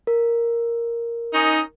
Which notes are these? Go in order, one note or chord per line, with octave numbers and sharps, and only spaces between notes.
A#4
C#4 D#4